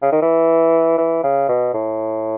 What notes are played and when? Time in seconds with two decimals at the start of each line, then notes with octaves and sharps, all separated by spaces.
0.02 C#3
0.12 D#3
0.22 E3
0.98 E3
1.24 C#3
1.48 B2
1.74 A2